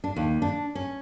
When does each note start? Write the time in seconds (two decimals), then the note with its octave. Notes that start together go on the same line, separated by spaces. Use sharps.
0.04 D4
0.16 D#2
0.42 D4
0.75 C#4